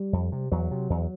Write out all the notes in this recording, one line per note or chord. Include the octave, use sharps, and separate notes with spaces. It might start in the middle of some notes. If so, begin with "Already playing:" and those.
Already playing: G3
F2
C3
E2 F#3
C3
E2